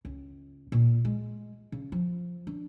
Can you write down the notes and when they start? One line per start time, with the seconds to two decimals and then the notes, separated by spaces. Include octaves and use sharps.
0.05 C#2
0.72 A#2
1.05 G#3
1.72 C#3
1.92 F3
2.47 D4